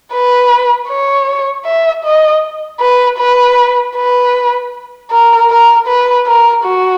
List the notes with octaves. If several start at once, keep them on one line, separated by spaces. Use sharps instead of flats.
B4
C#5
E5
D#5
B4
B4
B4
A#4
A#4
B4
A#4
F#4